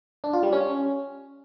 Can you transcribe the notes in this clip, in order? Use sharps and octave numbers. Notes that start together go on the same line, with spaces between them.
D4
F4
G3
C#4